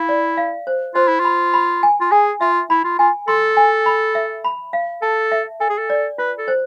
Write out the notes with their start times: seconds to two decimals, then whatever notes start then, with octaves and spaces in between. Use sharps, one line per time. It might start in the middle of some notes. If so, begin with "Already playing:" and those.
Already playing: E4 F5
0.09 D5
0.37 F5
0.67 C5
0.95 F4 C5
1.08 E4
1.20 F4 B5
1.54 B5
1.83 G#5
2.01 F4
2.11 G#4 G#5
2.41 F4 E5
2.70 E4 B5
2.84 F4
2.99 F4 G#5
3.28 A4 C6
3.57 G#5
3.86 B5
4.15 E5
4.44 B5
4.73 F5
5.02 A4 A5
5.32 E5
5.60 A4 G#5
5.69 G#4
5.78 A4
5.90 D5
6.18 F4 B4
6.38 A4
6.48 C5